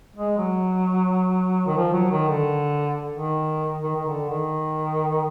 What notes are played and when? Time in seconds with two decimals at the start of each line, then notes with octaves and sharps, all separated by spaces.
0.16 G#3
0.38 F#3
1.66 D#3
1.77 F3
1.93 F#3
2.11 D#3
2.29 D3
3.15 D#3
3.83 D#3
3.96 D#3
4.07 D3
4.29 D#3